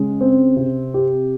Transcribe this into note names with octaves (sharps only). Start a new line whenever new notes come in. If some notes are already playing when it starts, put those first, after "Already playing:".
Already playing: C#3 G#3
C4
C3
G4